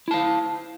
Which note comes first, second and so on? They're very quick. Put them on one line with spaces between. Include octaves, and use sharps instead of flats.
E4 A5 F5